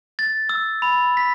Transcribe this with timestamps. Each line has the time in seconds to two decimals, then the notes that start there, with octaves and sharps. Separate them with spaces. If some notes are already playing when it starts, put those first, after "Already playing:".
0.19 A6
0.49 E6
0.82 B5
1.17 B6